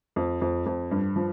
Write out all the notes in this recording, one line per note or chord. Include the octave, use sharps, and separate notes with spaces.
F2
F2
F2
G2
F3